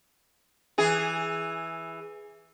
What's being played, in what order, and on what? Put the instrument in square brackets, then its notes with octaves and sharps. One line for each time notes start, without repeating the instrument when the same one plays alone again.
[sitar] E3 G#4